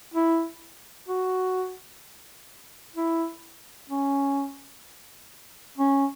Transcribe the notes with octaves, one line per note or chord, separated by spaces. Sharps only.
E4
F#4
E4
C#4
C#4